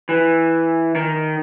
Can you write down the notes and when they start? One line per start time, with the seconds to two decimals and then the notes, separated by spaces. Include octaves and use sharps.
0.09 E3
0.95 D#3